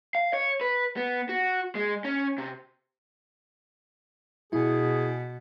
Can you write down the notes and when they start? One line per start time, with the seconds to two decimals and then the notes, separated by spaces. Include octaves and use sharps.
0.15 F5
0.34 C#5
0.61 B4
0.97 B3
1.29 F#4
1.75 G#3
2.05 C#4
2.38 C3
4.53 B2 E4 G#4